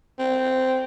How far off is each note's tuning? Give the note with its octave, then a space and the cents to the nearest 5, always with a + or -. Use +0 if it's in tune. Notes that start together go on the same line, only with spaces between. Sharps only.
C4 -10